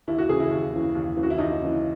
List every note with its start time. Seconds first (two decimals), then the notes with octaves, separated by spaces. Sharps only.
0.07 D#2 E4
0.18 F#4
0.29 C#3 E3 G#4
0.40 E4
0.51 D#2
0.73 C#3 E3
0.95 D#2
1.16 C#3 E3
1.23 F#4
1.30 E4
1.38 D#2 D#4
1.61 C#3 E3